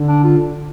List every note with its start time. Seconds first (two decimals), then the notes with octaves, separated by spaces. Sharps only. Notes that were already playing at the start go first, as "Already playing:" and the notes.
Already playing: D3
0.08 D4
0.24 F4